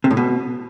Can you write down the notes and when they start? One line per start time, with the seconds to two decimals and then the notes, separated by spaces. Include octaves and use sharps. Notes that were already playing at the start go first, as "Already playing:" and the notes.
0.04 C3
0.11 A2
0.17 B2